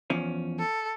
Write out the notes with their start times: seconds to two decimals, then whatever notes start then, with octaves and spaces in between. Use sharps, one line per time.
0.10 E2 F3 C#4
0.59 A4